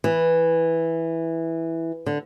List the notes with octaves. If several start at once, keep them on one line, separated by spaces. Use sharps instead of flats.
E3
D3